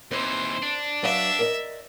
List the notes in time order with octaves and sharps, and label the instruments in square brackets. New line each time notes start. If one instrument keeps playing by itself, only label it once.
[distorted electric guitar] D#2 E3 [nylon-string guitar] C4 B4 [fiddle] C5
[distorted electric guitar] D4
[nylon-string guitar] F#3 B4 F5 [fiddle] E5
[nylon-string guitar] A#4 D5 D#5